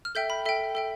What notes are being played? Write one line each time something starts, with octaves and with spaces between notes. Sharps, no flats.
F6
A4 E5 G5 G6
B5
A4 E5 G5
A4 E5 G5